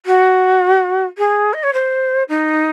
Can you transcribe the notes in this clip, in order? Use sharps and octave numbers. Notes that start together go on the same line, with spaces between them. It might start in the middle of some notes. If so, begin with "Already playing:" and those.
F#4
G#4
D#5
C#5
C5
D#4